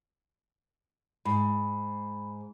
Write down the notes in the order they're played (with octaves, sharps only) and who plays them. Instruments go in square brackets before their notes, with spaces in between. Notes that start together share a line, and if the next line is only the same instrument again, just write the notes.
[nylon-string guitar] G#2 [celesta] B5